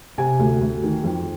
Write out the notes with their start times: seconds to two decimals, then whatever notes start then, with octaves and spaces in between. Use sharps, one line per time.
0.18 C3 G#5
0.39 D2
0.61 D2
0.83 D#3
1.03 F2